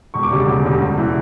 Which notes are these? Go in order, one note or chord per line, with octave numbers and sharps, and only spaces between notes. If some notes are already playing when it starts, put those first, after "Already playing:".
E1 C#6
D6
D2 C#3 G3
D6
E1
D2 C#3 G3
E1
E3